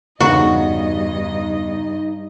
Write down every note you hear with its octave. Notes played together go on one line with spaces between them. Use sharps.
E2 G2 C#3 B3 D#4 F#4 D#5